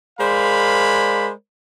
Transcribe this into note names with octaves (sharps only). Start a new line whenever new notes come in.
G#3 A#4 C5 D5 F5 B5